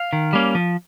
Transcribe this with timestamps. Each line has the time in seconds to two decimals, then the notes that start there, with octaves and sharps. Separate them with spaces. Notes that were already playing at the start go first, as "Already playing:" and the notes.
Already playing: F5
0.13 D#3
0.33 G3 A#3 C#4
0.55 F3